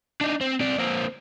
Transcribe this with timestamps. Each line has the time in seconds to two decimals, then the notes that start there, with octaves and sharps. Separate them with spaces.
0.21 D4 D#4
0.41 C4
0.60 C4 D5
0.78 A#3 C4